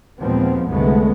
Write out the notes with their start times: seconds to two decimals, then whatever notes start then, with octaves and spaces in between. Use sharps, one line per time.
0.20 D#2 A#2 F3 G#3 B3 C4
0.69 C2 F#2 D3 G#3 A3 B3